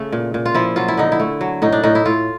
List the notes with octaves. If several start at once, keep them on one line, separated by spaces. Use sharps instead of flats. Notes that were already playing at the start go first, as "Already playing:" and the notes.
Already playing: C#3 A3
A#2
A#2
F4
F3 E4
F#3 F4
E4
D3 D#4
E4
A3
F#3
A2 D#4
D4
A2 D#4
E4
A2 F4